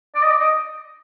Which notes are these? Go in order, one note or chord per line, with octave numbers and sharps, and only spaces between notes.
D5
D#5
D5
D#5